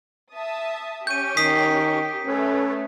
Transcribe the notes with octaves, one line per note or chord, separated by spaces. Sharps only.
E5 A5 D#6
C#4 G4 C#6 G6 D#7
D#3 D#6 B6 C7
A3 C#4 A4 B4 C#5